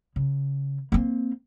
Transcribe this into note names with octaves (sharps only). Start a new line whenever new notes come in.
C#3
A#3 C4